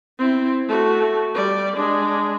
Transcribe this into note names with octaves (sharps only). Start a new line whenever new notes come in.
C4 E4
A3 F#4
G3 D5
G#3 D4